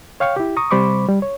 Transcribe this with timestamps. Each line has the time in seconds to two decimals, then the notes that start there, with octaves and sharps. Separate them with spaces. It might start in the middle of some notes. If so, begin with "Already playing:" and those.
0.20 C#5 F5 G5 C#6
0.36 E4 G4
0.57 A#5 C#6 D#6
0.71 C3 G3 C5 B5 C#6 D6
1.08 G3
1.22 C#5